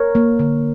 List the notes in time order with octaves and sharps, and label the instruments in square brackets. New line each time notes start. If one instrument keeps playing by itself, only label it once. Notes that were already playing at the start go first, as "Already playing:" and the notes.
Already playing: [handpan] A#4 C#5
A#3
D3